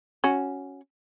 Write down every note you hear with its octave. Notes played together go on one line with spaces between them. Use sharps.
C#4 F#4